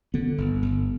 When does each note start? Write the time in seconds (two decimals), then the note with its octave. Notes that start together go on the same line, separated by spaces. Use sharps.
0.14 D3 B3
0.38 G1
0.62 G1